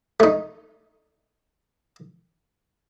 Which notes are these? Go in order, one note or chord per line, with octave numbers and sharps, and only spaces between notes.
A3 D#4